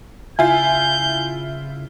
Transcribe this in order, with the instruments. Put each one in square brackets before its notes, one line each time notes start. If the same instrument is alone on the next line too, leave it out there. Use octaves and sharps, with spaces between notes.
[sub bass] C#3 [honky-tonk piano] E4 F4 [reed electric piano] G#5 [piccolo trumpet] G6